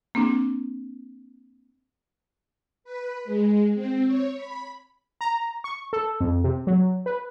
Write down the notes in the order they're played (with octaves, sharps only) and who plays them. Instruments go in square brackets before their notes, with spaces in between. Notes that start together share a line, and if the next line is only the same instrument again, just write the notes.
[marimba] A#3 C4 D4
[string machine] B4
G#3
C4
C#5
B5
[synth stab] A#5
C#6
A4
F2
C3
F#3
B4